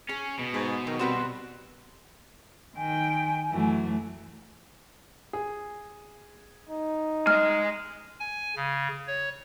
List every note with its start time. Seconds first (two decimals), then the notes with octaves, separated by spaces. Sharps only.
0.09 C#4 G#4
0.39 B2
0.54 G#2 G#4
0.87 D#3 F#3
0.99 G3 C4 F#4 B4
2.76 D#3 G5 G#5
3.51 F#2 E3 F#3 A3
5.33 G#4
6.69 D#4
7.27 G#3 D#5 F6
8.20 G#5
8.56 C#3
9.08 C#5